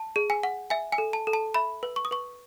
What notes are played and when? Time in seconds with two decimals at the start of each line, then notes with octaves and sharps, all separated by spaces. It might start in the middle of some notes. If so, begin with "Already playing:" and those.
Already playing: A5
0.16 G#4
0.30 G#5
0.43 F#5
0.70 E5 G#5
0.92 G#5
0.98 A4
1.13 A5
1.27 A4
1.33 A5
1.54 E5 B5
1.83 B4
1.96 C#6
2.05 D#6
2.11 B4 C#6